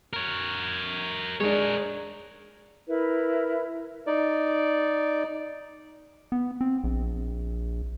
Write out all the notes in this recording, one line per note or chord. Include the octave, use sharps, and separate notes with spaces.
A#4 C#5
G#3 D4 A#4 C#5
E4 A#4 B4
D#4 D5
B3
C4
A#1